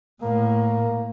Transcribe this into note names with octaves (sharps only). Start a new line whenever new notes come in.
A2 A#3 A#4